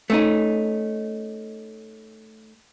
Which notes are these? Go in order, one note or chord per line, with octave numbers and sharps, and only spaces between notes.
A3 C#4 D#4